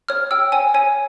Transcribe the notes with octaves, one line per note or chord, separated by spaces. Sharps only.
C#5 F6
G5 E6
C#5 G#5
C#5 G#5